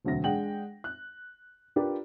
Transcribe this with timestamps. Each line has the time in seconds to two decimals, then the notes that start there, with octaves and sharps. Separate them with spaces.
0.04 E1 D2 F#3 C4 A#6
0.24 G#3 D4 G#4 F#5 G5 F#7
0.84 F#6
1.76 D4 F4 G4 A#4 B4 D5